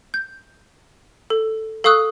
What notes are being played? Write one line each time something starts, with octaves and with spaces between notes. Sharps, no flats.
G6
A4
A4 F5 C#6 D#6 E6 F#6